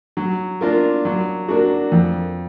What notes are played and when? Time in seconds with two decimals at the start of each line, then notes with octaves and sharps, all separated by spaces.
0.17 F#3
0.61 A#3 D4 F4 A#4
1.05 F#3
1.48 A#3 D4 F#4
1.92 F2